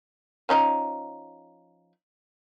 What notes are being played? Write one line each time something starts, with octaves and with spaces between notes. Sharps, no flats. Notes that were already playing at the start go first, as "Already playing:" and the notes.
F3 C#4 D#4